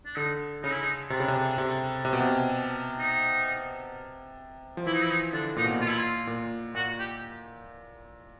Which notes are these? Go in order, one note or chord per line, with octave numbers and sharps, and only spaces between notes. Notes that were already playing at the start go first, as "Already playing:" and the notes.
D4
D3 D#4
C#3 D#4
E4
D#4
C3 D4
C#3
C3
C3
C3
B2
C3
D#4
F3
E3 E4
D#4
E4
D#4
D3 D4
A#2 D#4
B2
A#2
A#2 F4
E4
F4
A#2
A#2 F#4
G4